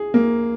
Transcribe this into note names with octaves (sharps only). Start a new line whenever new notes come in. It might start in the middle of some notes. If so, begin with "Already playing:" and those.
Already playing: G#4
A#3